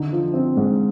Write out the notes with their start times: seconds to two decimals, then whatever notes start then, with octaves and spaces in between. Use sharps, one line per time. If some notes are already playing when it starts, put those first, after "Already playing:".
Already playing: D3 D#4
0.12 F3
0.34 C4
0.57 G#2